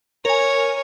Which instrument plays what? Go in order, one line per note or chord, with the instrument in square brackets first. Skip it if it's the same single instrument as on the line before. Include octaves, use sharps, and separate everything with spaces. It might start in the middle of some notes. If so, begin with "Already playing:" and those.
[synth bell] A#4 G#5 [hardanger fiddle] C#5